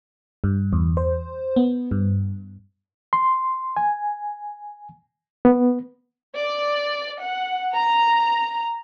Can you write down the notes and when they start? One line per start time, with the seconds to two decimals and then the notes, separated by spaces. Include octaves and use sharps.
0.44 G2
0.73 E2
0.97 C5
1.56 B3
1.91 G2
3.13 C6
3.77 G#5
5.45 B3
6.36 D5
7.22 F#5
7.74 A#5